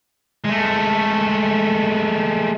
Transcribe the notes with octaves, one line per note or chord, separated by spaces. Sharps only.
G#3 A3